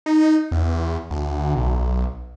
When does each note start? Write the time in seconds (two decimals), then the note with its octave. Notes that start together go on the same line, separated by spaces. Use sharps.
0.06 D#4
0.51 E2
1.11 D2
1.55 B1